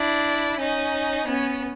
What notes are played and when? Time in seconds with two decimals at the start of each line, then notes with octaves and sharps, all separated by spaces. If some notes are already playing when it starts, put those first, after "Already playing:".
Already playing: D4 E4
0.59 C#4 D#4
1.27 B3 C#4